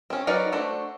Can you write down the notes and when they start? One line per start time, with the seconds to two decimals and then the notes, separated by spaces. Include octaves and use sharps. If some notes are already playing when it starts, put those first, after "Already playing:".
0.10 C4 C#4
0.27 F#3 D#4 A#4 B4 D5
0.52 A3 D4 F#4 C5